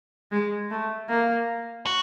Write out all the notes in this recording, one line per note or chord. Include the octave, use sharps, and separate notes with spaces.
G#3
A3
A#3
F#4